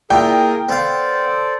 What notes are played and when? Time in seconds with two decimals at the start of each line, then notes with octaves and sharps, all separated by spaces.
0.10 A#2 E4 G#4 A#4 G5 G#5
0.69 B3 A4 C5 D5 F5